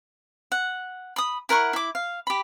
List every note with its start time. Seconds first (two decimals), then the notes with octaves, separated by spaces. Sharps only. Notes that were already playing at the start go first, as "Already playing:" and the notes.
0.52 F#5
1.16 B5 D#6
1.49 E4 A#4 F#5 C#6
1.73 E4 D6
1.95 F5
2.27 G4 B5